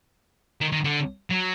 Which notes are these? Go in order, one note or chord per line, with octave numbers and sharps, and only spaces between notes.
D#3
D#3
D3
F#3